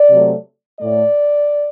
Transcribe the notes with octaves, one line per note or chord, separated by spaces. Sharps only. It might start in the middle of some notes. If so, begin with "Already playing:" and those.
Already playing: D5
C3 F#3 A3
A2 A3 D5